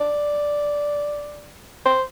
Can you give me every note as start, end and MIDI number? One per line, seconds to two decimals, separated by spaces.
0.01 1.56 74
1.85 2.02 72